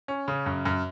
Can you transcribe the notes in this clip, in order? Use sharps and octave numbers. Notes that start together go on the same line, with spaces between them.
C#4
C#3
F#2
F#2